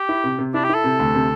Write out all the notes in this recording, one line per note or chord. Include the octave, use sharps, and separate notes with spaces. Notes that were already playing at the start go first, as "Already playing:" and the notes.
Already playing: G4
E4
C3
C3
D4 E4
G4
E4 A4
C3
D2
C3